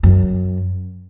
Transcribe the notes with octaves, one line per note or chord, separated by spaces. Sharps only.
F#2